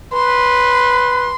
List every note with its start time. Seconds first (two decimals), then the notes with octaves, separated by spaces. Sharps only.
0.13 B4 C6